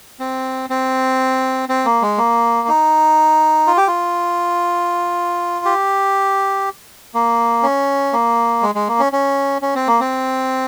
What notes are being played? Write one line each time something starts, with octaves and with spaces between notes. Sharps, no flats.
C4
C4
C4
A#3
G#3
A#3
D#4
F4
G4
F4
G4
A#3
C#4
A#3
G#3
G#3
A#3
C#4
C#4
C#4
C4
A#3
C4